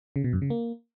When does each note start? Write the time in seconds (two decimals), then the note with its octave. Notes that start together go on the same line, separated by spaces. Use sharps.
0.16 C#3
0.24 B2
0.33 F#2
0.42 C#3
0.50 A#3